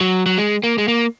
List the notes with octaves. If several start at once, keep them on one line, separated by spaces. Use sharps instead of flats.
F#3
F#3
G#3
A#3
G#3
A#3